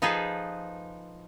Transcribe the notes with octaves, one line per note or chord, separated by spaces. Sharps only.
F3 D#4 F4 G#4 A4 B4